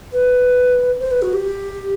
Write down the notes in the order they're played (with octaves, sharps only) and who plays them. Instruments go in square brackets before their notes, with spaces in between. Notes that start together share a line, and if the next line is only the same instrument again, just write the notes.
[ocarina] B4
C5
B4
F#4
G4